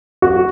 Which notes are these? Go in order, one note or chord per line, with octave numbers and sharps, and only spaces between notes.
F#4